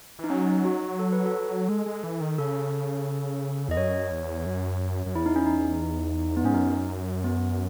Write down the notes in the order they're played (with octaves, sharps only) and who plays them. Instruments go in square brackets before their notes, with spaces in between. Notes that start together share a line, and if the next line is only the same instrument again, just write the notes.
[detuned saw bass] E3
[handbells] D#4
[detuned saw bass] F#3 [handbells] C#4
[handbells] D#4
F#4
A4
B4
A4
[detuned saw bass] G#3
G#3
E3
D#3
[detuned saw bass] C#3 [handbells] A4
[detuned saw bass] E2 [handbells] D#5
[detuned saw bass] F#2 [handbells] C#5
[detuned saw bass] E2
F#2
F#2
[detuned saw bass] E2 [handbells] E4
[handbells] D#4
C#4
D#4
B3
[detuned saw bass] G#2 [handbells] C#4
[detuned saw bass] F#2 [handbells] D#4
[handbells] B3